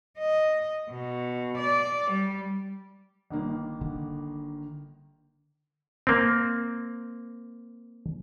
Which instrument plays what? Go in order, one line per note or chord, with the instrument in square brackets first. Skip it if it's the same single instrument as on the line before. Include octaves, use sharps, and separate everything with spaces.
[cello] D#5
B2
D5
G3
[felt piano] G1 D#3 A#3
[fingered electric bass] D3
[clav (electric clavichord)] A#3 C4